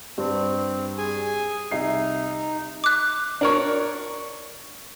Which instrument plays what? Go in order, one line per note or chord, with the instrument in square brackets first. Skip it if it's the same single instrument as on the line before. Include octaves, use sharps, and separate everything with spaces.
[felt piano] G2 [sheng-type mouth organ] C4
[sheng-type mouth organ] G#4 G#5
[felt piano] C2 E5 C7 [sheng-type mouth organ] D#4
[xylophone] D6 F#6
[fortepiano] D4 A#4 C#5